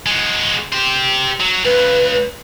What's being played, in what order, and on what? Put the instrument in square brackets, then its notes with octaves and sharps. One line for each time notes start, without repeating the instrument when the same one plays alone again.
[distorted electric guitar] G#3 F#4
G4 C5
F#3
[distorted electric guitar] C#2 [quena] B4